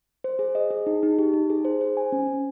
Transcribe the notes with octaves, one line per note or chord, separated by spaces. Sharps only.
C5
G#4
D#5
G#4
D#4
D#4
G4
D#4
G#4
C5
C5
G#5
C#4
C#4